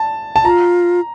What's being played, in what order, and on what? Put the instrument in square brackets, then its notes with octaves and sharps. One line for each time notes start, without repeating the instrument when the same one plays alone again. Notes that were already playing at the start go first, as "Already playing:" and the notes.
Already playing: [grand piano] A5
A5
[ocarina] F4 [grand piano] A#5